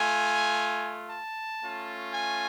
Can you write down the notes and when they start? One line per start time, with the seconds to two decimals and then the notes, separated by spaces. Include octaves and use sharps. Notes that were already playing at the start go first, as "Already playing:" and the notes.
Already playing: A3 F4 G#5
1.10 A5
1.62 A3 C#4 F4
2.14 G#5